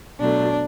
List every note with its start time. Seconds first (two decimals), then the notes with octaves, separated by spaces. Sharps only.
0.20 B2 F#3 A3 D4